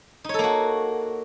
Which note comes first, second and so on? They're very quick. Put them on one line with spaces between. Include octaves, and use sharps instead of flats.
D#4 C#5 A4 A#3 F#4